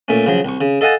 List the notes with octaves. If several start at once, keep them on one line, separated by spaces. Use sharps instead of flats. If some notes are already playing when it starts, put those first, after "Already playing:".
A#2 A3 C#4
C#3 F3 F#3
C2 C#6
C#3
A4 D#5 F5 F#5 G#5 A5